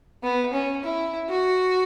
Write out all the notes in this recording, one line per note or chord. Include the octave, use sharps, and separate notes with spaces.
B3
C#4
E4
F#4